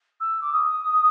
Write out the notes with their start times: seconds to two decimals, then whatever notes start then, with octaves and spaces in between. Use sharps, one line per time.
0.20 E6
0.41 D6
0.52 D#6